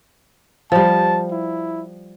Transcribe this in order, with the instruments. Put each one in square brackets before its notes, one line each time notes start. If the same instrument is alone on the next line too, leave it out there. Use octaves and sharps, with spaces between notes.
[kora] F3 G3 [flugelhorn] A5
[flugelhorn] E4